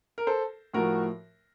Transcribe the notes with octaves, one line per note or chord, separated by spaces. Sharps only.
A#4
A4 C5
A2 F3 F#4 A#4